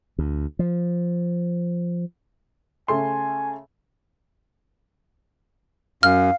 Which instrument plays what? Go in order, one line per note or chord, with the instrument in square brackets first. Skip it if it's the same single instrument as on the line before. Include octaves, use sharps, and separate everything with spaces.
[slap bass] D2
F3
[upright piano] C#3 A3 C6 [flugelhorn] G#5
[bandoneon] F#2 [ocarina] F5 [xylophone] F6